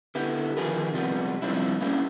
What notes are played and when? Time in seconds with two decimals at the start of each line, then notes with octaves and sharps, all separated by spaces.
0.15 D3 B3 E4 G4
0.57 D#3 F3 G#4 A#4 B4
0.93 C3 F3 G3 G#3 B3
1.42 F3 G3 C4 D4 E4
1.81 A#3 C#4 D4 E4 G4